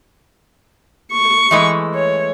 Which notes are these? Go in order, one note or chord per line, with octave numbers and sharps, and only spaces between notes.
C#6
E3 G#3 A3
C#5